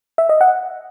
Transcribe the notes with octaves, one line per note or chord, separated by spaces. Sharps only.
E5
D#5
F#5